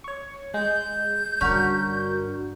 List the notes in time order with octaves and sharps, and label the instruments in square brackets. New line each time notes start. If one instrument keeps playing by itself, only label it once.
[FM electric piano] C#5 C#6
[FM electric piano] G#3 [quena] G6
[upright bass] G2 D3 [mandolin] C#4 [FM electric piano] D4 F#4 A#4